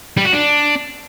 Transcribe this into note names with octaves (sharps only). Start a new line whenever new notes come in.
G3
F#4
D4